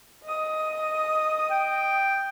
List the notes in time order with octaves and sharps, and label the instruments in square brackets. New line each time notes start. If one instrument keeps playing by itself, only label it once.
[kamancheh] D#5 D#6
[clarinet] G5